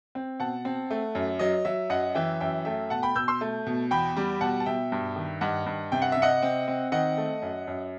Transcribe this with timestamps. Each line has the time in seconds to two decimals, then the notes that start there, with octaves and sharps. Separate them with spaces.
0.15 C4
0.40 B2 F#5 A5
0.65 C4
0.90 A3
1.15 F#2
1.39 F#3 D#5
1.65 F#3 E5
1.90 F#2 D#5 F#5
2.15 E3 E5 G5
2.40 F#2 E5 G5
2.65 A3 E5 G5
2.90 B2 F#5 A5
3.03 G5 B5
3.15 B2 E6 G6
3.28 C6 E6
3.41 A3
3.67 B2
3.91 E2 G5 B5
4.17 G3
4.41 B2 F#5 A5
4.60 A5
4.66 B2 E5 G5
4.92 G2
5.16 D#3
5.41 G2 D#5 F#5
5.66 G2
5.92 C3 G5
6.02 F#5
6.12 C3 E5
6.22 D#5 F#5
6.42 C4
6.68 C4
6.92 D#3 D#5 F#5
7.17 A3
7.42 F#2
7.67 F#2